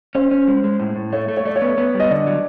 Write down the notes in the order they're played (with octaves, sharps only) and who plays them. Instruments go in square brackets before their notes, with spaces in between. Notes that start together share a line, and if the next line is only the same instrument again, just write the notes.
[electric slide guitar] C#4 [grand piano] C5
[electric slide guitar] C#4
G#3
G#3
A2
A2
[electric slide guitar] A3 [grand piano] C#5
[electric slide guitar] A3
[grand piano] C#5
[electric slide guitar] A3 [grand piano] D5
[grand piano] C#5
[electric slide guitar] B3
B3
G3
[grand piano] D#5
[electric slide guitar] D3 [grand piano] D5
[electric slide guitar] F#3